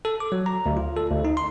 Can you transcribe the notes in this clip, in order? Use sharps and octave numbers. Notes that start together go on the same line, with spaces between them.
A4
D6
F#3
A#5
D2
F4
A4
D2
D#4
C6